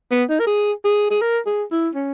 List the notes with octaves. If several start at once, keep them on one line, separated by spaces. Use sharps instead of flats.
B3
D#4
A#4
G#4
G#4
G#4
A#4
G#4
E4
C#4